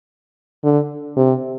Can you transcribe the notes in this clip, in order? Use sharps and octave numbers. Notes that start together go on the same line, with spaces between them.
D3
C3